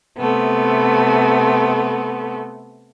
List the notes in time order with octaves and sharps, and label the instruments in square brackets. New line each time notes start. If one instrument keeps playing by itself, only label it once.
[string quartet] C3 A3 B3